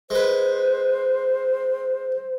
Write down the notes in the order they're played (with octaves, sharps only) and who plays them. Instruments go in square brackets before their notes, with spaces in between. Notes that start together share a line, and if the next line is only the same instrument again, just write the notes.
[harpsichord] G#3 B4 [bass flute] C5